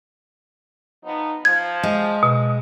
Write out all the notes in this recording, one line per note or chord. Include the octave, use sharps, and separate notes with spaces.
F3 B3 D#4
F3 G#6
G#3
B2